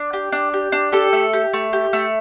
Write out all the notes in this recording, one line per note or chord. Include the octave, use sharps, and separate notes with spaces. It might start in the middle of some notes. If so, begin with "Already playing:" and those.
Already playing: D4
G4
D4
G4
D4
G4 A4
A3
G4
A3
G4
A3